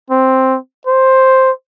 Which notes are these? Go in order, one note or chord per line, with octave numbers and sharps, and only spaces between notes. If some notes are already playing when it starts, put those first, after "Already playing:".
C4
C5